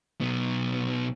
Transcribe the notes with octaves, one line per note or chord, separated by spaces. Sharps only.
B1 B3